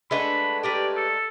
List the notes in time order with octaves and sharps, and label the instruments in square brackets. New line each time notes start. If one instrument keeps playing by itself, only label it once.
[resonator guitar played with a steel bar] G#3 A3 D4 [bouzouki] A4 B4 F#5 [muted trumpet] B5
[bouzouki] G4 A#4 B4 [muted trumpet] D5
[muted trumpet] A4